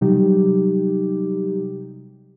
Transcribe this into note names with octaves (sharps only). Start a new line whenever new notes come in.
C3 F#3 G3 D#4 G4